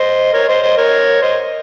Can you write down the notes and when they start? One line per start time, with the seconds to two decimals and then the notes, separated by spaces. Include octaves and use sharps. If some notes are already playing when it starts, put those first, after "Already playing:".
Already playing: C5 D#5
0.33 A#4 C#5
0.49 C5 D#5
0.62 C5 D#5
0.78 A#4 C#5
1.22 C5 D#5